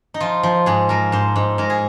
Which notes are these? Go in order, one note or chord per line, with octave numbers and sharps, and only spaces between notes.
D#4
F3 F4
F3
G#2 G#4
F3 A#4
G#2 C5
G#2
G#2 A#4
G#4